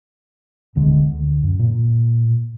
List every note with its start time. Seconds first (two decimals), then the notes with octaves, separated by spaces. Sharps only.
0.75 E1 D2 D3 G#3
1.11 D2
1.43 F#2
1.59 A#2